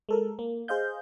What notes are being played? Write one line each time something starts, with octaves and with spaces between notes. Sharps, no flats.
G#3 A4 A#4
A#3
G#4 C5 D#5 F5 G6